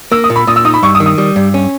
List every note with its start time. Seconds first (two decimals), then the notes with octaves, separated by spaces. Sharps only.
0.12 A#3 E6
0.24 D#6
0.30 A#2
0.36 B5
0.47 A#2 D#6
0.56 E6
0.65 D#4 D#6
0.74 B5
0.83 G2 C#6
0.95 D#6
1.00 D#3
1.06 D#6
1.18 G3
1.36 G2
1.54 C#4